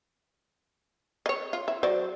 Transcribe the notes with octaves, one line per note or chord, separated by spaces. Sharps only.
C#5 D#5
F4
E4
F#3 C5 D5